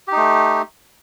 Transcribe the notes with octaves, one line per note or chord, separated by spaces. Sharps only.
A3 D#4 G4